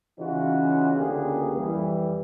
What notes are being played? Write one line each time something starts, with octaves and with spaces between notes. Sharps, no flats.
C#3 E3 C#4 D#4 F4 F#4
C#2 D3 A#3 B3 G4 G#4
F2 E3 G3